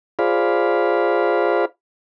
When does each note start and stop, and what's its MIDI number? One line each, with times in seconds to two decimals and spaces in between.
0.19 1.65 65
0.19 1.65 68
0.19 1.65 72
0.19 1.65 74
0.19 1.65 77
0.19 1.65 83